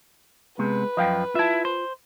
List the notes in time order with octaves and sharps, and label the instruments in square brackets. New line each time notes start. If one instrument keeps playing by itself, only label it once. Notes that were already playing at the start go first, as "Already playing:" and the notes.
[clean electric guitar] C3 [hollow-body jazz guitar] G#3 B3 [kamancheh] B4
[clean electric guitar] F#2 F3 [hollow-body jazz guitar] D#5 F5 G5
[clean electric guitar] E4 E5 [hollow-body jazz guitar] F4 A5
[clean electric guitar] C5